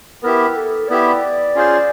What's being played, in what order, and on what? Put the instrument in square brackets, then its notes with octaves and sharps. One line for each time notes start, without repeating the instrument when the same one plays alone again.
[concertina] B3 E4 G4 [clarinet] A#4
[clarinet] A4
[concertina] B3 E4 G4 [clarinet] D5
[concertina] C#4 F4 G#4 C5